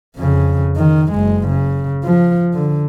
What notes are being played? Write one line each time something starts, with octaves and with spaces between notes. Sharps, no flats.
F2 C#3
D#3
F#1 G#3
C#3
F3
D3